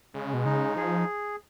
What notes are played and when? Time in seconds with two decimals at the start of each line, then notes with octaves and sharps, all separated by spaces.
0.14 C#3 G#3
0.34 B2
0.45 C#3 D#4
0.76 F3 G#4